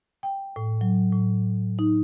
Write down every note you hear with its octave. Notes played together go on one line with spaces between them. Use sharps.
G5
A2
F#3
A2
D#4